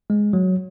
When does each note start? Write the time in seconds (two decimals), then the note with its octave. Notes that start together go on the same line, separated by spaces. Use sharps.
0.10 G#3
0.33 F#3